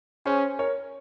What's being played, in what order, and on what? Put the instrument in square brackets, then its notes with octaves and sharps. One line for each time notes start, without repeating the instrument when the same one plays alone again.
[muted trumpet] C#4 [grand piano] G#4 C5
[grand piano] A#4 C#5